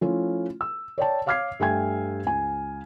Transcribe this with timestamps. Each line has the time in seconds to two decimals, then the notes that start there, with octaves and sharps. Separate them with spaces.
0.01 F3 A3 C#4 E4 F4
0.61 E6
0.98 C#5 D5 G5 A5
1.26 C#5 F5 D6 F6 G#6 C7
1.60 G2 A3 E5 G5 G#5 G#6
2.26 C#2 G#5